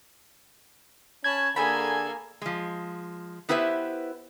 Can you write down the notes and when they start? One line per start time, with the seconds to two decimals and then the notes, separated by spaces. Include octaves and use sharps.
1.24 C#4 A5 B5 G#6
1.56 D3 A#3 G#4 A4 G#5 B5
2.42 F3 G#3
3.49 B3 E4 G4 B4 C5 E5